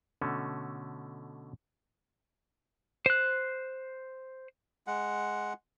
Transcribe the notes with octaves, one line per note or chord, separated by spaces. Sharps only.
B2 D3 A3 C#4
C5 F#6
G#3 F#5